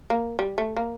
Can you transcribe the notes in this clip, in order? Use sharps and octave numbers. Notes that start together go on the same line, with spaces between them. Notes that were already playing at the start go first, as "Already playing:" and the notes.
A#3
G3
A3
A#3